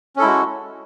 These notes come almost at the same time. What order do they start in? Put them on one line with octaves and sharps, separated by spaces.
C#4 A4 E4 G#3 F#4